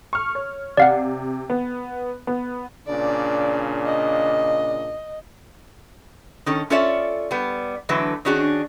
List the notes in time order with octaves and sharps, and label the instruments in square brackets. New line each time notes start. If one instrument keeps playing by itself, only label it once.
[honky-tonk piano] C#6 F6
C#5
[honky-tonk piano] C3 [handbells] D5 F5 F#5
[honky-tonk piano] B3
B3
[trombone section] A#2 C#3 D4 [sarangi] D5
[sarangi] D#5
[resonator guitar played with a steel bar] D#3 C#4 A4
C#4 F4 A4 C#5 D5 E5
G3 B3
D3 E3 F#3 A3 B4
D#3 C#4 D4 F#4 G#4